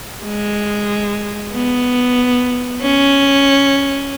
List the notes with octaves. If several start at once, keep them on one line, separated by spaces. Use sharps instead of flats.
G#3
B3
C#4